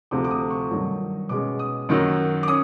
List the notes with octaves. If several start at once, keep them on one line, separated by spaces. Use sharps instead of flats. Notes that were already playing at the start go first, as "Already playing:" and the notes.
D2 C3 F3 A3 D6
D6
D#6
C#6
G2 D#3 F#3
B2 G#3 C#4 D6
D#6
F#2 D#3 F#3
D6
C#4 D#6